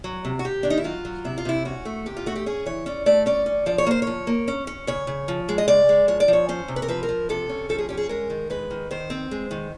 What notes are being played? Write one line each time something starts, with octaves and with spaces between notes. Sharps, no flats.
F#3
C3
F#4
C3 G4
D#3 D4
D#4
E4
F#3 F4
F#3
C3 E4
F4
C3 E4
C#4 F#4
A3
C3 G4
F4
A3 F#4
G4
C#4 G#4
E3 C#5
C#4 D5
A3 D5
C#4 D5
C#4
F3 D5
C#5
A#3 C5
F3 C#5
A#3
C#4
C#4
C#3 C#5
C#3
F3
G#3
D#5
C#3 D5
G#3
F3 C#5
D5
F3
C#5
C#4 C5
C3
B4
A#4
F3 B4
A#4
F3
C3 A4
C#4
F3 A4
G#4
C#4 G4
G#4
G#3 A#4
D#3
G#3 B4
D#3
D#3 C5
C4
G#3
D#3